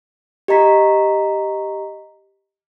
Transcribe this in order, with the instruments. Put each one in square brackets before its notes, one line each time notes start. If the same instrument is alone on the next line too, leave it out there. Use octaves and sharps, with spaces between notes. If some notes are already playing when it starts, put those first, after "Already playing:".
[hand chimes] G4 D#5 A#5 B6